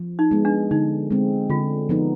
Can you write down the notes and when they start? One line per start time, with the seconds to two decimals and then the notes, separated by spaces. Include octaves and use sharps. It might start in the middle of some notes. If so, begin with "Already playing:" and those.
Already playing: F3
0.19 D#4
0.31 G#3 B3
0.45 D4
0.71 D3 D#4
1.10 G#3 C4
1.50 D3 F4
1.89 F3 B3 D#4